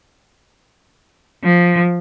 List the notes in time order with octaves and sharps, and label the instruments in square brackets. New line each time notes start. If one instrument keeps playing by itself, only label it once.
[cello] F3